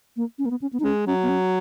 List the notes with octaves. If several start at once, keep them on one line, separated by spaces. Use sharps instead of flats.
A#3
C#4
A#3
B3
C#4
B3
D#4
G#3 C#4
F#3 C#4
B3
C#4